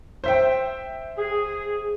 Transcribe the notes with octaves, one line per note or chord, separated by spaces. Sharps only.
C5 E5 G5
G#4